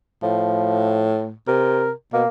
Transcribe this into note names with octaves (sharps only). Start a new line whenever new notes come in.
A2 F3
C3 A#4
B2 A#3